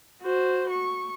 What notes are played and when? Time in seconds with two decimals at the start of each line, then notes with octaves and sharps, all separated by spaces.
0.22 F#4 C5
0.70 C#6